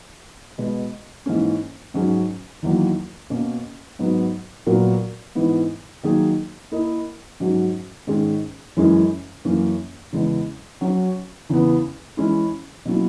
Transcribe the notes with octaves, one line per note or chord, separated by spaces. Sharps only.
B2 G#3 B3
G#2 E3 A#3 C#4
G#2 F#3 C#4 G#4
E2 D#3 F#3 A#3
B2 A#3 C#4
G#2 F#3 B3
A#2 F#3 B3 F#4 A#4
G#2 E3 B3
D#3 F#3 A#3 D#4 G#4
A#3 E4 A#4 D#5
G#2 F#3 C#4 F#4
G#2 D#3 G#3 C#4 G#4
F#2 E3 G#3 C#4 G#4
F#2 E3 A#3 C#4
E2 C#3 G#3 B3
F#3 C#4 F#4 C#5
E2 C#3 E3 B3
E3 G#3 C#4 E4
B2 F#3 A#3 C#4 E4